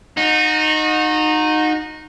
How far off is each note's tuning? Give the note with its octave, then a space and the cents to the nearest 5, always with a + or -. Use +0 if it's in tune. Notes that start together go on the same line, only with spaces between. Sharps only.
D#4 -10 F#4 -35